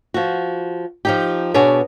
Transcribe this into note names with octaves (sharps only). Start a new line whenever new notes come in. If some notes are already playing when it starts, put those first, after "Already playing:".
F3 F#4
F3 D#4 G4
B2 B3 D4 G#4 C#5 D5